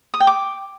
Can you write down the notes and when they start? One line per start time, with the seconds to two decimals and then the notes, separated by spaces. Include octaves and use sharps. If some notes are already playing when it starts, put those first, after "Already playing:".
0.14 D#6
0.20 G5
0.27 D6